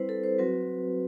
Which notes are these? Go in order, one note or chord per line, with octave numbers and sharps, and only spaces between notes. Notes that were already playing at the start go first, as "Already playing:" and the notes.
Already playing: G3 C4 E4 B4 C5
A4
C5
F#3 C4 F#4 B4